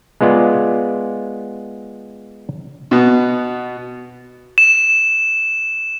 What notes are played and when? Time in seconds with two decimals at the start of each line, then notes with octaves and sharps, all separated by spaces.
0.21 G#3 B3 F4 D5
2.91 B2 B3
4.58 E7